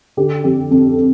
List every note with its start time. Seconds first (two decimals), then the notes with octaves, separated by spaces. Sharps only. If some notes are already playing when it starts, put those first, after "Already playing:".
0.17 D3 G4
0.44 F2 G4
0.71 F2 A4